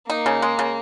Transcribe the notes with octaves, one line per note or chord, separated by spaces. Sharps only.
A#3 D#4
C#3
G#3
C#3